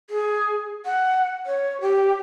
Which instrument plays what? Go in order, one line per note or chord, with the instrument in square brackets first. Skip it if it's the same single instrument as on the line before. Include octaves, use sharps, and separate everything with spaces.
[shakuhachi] G#4
F#5
C#5
G4